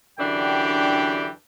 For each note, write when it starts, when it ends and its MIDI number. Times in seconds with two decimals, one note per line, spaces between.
0.20 1.29 42
0.20 1.29 50
0.20 1.29 52
0.20 1.29 62
0.20 1.29 67
0.20 1.29 79